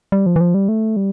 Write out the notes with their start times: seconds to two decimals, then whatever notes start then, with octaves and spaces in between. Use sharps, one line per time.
0.12 G3
0.26 F3
0.36 E3
0.41 F3
0.54 G3
0.69 A3
0.96 G3